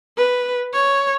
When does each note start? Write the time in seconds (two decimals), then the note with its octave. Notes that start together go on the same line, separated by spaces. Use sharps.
0.17 B4
0.73 C#5